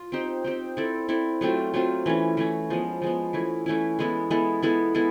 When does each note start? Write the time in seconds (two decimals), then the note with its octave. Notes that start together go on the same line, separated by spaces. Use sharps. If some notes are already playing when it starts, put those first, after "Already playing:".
Already playing: F4
0.12 C4 D#4 G4 C5
0.44 C4 D#4 G4 C5
0.77 C4 E4 A4 D5
1.08 C4 E4 A4 D5
1.41 F#3 A3 C4 F4
1.74 F#3 A3 C4 F4
2.06 E3 A3 C#4
2.37 E3 A3 C#4
2.70 F3 G#3 B3
3.02 F3 G#3 B3
3.33 E3 A3 C#4 E4
3.66 E3 A3 C#4 E4
3.99 G#3 B3 E4 A4
4.31 G#3 B3 E4 A4
4.63 G#3 B3 E4 A4
4.95 G#3 B3 E4 A4